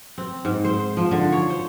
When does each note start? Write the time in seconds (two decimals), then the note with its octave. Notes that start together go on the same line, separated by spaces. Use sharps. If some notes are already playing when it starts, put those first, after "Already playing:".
0.18 C4
0.45 G#2
0.64 C5
0.97 F3
1.11 D3
1.32 C#5
1.50 C5